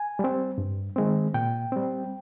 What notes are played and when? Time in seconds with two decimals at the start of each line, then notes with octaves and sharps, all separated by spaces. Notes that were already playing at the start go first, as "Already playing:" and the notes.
Already playing: G#5
0.19 G3 C4
0.58 G2
0.96 D#3 G#3 C4
1.34 A#2 G5
1.72 G3 C4